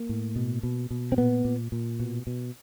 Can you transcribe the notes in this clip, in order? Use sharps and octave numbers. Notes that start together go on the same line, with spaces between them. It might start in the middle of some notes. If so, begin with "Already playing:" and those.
Already playing: A#3
A2
B2
B2
B2
C4
A#2 B3
A#2
A#2
B2
B2